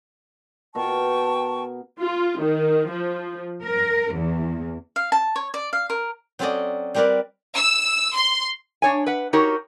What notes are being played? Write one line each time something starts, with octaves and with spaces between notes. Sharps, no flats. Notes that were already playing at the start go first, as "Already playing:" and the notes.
B2 A#4 G5 A5 C#6
F4
D#3
F3
A#4
E2
F5
A5
C#5
D5
F5
A#4
F#3 C4 C#4 A4 D5 D#5
G3 C4 A#4 B4 D5
E6
C6
D4 C#5 G#5
B4 F#5
D#4 F#4 G4 A#4 C#5